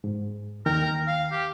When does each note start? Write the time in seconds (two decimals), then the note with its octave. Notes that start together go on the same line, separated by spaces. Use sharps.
0.04 G#2
0.66 D#2 D#3 A#4 G5
1.07 F5
1.32 G4